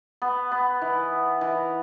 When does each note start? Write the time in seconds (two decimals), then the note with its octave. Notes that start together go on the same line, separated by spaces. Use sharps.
0.22 B3
0.52 B3
0.82 E3
1.41 E3